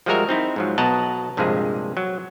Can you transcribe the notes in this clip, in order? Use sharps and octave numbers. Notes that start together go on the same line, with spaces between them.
F3 G3 G#3 F#4 A#4 E5
C4 D#4 E4
G#2 F3 F#3
B1 B2 D#5 F#5 A5 A#5
A#1 G2 C3 F3 G#3 G#4
F#3